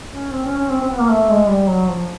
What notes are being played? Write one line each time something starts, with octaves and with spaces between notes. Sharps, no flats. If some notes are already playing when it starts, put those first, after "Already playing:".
C#4
C4
C#4
C#4
C4
C4
B3
A#3
A3
G#3
G3
F#3
F3